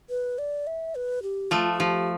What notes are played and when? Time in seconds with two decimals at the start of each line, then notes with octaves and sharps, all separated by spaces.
0.10 B4
0.38 D5
0.67 E5
0.95 B4
1.23 G4
1.51 F3 A3 F4
1.73 F4
1.79 F3 G4